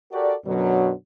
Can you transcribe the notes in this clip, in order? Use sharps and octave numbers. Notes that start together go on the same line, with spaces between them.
F#4 G4 A4 A#4 D5
F#2 B2 D3 F#3